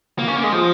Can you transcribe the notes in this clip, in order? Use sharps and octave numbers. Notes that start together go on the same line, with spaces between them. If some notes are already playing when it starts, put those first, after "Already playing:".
A#3
C#4
A#3
G#3
F3